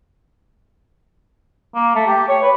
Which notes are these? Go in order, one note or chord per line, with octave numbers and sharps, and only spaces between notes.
A#3
A3
G4
C#5
B4